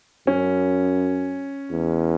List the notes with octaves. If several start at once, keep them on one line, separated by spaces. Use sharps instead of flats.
F#2 C#4
E2